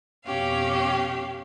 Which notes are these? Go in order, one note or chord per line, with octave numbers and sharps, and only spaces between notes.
F2 B2 C#4 G4 F5